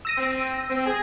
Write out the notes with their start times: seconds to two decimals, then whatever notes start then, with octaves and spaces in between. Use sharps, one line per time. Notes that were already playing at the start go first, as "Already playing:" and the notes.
0.05 E6 A#6 D#7
0.18 C4
0.70 C4
0.86 G#4